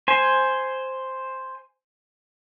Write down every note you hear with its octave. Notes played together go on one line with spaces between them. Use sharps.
C5 G#5